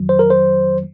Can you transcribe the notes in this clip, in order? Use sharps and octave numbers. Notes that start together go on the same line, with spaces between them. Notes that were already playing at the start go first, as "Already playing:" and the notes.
Already playing: F2 D#3 F#3
C5
A#4
C5